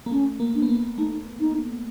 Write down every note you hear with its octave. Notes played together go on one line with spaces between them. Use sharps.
A#3
A3 C#4
A#3
D4
B3
A#3
A3 D#4
D#4